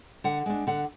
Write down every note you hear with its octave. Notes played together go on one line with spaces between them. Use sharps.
D3 F#5
G#3 D4
D3 F#5